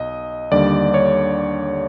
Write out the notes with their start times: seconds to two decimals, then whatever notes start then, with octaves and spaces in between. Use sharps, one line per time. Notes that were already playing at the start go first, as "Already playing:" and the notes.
Already playing: B1 D#5
0.52 D#2 D3 G3 D5
0.94 C#5